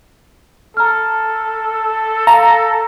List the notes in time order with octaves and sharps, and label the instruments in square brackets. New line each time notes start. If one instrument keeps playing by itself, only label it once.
[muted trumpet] A4 [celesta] A#5 F6
[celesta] F5 [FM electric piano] A#5